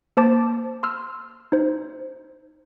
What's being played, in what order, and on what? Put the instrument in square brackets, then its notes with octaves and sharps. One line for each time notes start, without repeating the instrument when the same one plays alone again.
[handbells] A#3 C5 A5 D6 A6
C6 E6 F6
D#4 C5